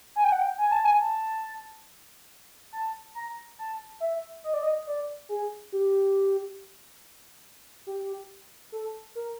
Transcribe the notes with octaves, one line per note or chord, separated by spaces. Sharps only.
G#5
G5
F#5
G5
G#5
A5
G#5
A5
A5
A#5
A5
E5
D#5
D5
D#5
D5
G#4
G4
G4
A4
A#4